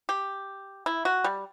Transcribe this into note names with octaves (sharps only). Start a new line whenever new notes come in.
G4
E4
F#4
G3